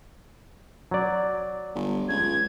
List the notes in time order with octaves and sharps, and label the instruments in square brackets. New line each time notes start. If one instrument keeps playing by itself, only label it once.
[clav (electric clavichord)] F#3 D5
[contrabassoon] G1
[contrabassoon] C#2 [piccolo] G#6